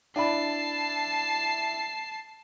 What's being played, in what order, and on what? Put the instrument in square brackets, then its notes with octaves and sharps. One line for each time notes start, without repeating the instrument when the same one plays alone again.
[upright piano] D4 E4 B5 [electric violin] A5 C7